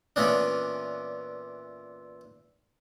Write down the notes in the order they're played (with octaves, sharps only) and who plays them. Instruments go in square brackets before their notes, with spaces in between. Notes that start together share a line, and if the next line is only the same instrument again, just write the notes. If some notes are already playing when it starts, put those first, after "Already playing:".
[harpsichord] A#2 E3 B3 C#4 D4